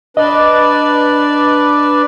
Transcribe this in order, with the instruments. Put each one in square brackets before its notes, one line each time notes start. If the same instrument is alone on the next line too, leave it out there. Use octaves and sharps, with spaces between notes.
[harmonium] D4 B4 D5 [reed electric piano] D#5